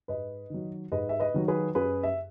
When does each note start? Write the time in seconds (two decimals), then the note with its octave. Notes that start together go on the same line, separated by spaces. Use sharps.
0.08 G#2 B4 D#5
0.50 D#3 F#3
0.92 G#2 B4 D#5
1.09 E5
1.20 B4 D#5
1.34 D#3 F#3
1.48 G#4 B4
1.75 F#2 G#4 B4
2.03 E5